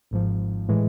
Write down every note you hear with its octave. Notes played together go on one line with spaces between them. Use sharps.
G#1 G#2 F3
A2 E3 G#3